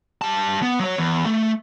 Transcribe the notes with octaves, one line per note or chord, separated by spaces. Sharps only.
G3 A5
B3
F#3 C#5
E2
A3